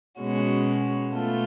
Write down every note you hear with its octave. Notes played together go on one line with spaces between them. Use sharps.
B2 G#3 C#4 F#4
B2 A3 F4 A4